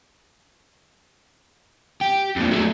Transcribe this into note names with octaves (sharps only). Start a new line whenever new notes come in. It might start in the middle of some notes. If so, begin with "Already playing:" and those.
G4
F2 A#2
F#3 A3